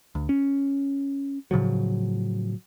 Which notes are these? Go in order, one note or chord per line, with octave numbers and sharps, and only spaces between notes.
D2
C#4
A2 C#3 F3 F#3